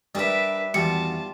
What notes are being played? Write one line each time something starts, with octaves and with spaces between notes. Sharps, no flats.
G3 D4 A#4 B4 E5
E2 D#3 G3 F4 F#4 A5 C#7